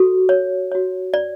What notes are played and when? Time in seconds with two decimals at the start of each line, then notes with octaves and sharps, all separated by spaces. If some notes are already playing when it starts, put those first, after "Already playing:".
Already playing: F#4 A4
0.29 C#5
0.72 F#4 C#5
1.14 D5